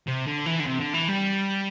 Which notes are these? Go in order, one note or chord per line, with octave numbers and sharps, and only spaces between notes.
C3
D3
E3
D3
C3
D3
E3
G3